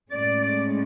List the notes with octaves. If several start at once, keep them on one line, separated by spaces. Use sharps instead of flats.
A2 G#3 C#4 D5